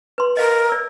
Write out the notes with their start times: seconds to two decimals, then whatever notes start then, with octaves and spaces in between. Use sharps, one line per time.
0.18 B4 C6
0.37 A#4 D#5 F5
0.69 D5 E6